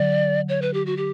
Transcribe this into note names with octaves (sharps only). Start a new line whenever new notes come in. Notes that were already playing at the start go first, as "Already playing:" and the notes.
Already playing: D3 F#3 D5
C#5
B4
G4
F#4
G4